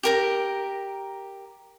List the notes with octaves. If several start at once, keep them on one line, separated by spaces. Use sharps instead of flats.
G4 A#4 A#5